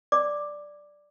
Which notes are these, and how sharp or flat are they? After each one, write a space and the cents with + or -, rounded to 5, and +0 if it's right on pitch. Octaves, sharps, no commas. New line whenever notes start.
D5 +0 D6 +10